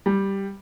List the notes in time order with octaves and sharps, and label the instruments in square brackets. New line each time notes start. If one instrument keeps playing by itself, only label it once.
[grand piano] G3